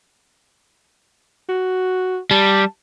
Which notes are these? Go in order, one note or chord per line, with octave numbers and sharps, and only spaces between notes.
F#4
G3 A5